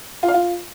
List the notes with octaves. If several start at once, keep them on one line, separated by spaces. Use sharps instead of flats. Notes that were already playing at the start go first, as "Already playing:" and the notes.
F4
F5
F4